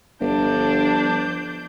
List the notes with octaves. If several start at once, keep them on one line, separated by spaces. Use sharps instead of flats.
G1 F3 D4 G6